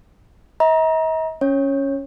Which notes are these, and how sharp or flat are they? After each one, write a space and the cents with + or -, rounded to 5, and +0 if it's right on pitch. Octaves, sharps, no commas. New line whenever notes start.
D#5 +45 A#5 +25
C#4 +0 C#5 -15